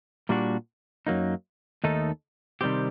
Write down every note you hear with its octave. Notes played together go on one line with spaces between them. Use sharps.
A#2 G3 A#3 D4 F#4
F#2 F#3 A#3 D#4
D#2 D#3 A3 D#4 A4
C3 D#3 G3 C4 G4